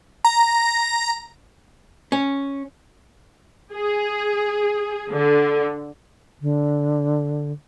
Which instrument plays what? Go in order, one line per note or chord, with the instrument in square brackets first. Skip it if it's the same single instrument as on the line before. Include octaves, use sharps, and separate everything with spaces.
[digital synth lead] A#5
[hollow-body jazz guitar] C#4
[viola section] G#4
D3
[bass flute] D3